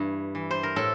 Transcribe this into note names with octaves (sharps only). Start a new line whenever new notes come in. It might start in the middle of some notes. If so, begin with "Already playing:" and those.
Already playing: G2 E3
E3
C5
A#4
A2 A4